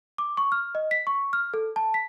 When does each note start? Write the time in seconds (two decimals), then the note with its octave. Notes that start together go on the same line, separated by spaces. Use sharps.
0.18 D6
0.37 C#6
0.52 F6
0.75 D#5
0.91 B6
1.07 C#6
1.33 F6
1.54 A4
1.76 A5
1.94 B6